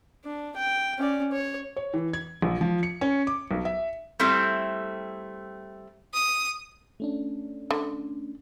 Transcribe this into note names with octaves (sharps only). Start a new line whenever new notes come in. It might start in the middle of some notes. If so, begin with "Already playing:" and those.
D4
G5
C#4 D5
C#5
C#5
E3
G#6
A#1
F3
C#7
C#4
D6
B1
E5
G3 A3 C4 E4
D#6
A3 C#4 D4
D3